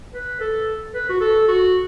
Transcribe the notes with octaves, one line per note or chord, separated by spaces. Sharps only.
B4
A4
B4
F#4
A4
F#4